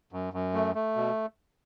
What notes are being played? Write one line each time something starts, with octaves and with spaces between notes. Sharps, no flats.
F#2
F#2
A3
A3
B2